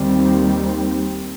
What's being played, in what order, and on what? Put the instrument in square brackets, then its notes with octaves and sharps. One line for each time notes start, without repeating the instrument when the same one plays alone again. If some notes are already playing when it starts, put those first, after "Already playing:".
Already playing: [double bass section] D#2 D#3 G3 C4